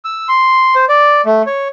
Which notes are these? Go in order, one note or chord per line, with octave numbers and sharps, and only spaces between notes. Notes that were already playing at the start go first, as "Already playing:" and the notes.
E6
C6
C5
D5
A3
C#5